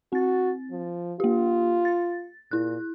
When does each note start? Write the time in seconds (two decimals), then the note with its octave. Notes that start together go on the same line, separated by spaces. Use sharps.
0.13 C4 F#4 A6
0.71 F3
1.20 A#3 F4 G4
1.85 A6
2.51 A#2 E4 F#6